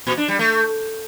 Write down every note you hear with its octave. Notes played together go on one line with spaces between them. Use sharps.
A#2
D4
G3
A3